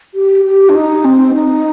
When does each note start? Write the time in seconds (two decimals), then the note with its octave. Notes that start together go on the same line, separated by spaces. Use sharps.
0.14 G4
0.45 G4
0.69 D4
0.75 D#4
1.04 C4
1.34 D#4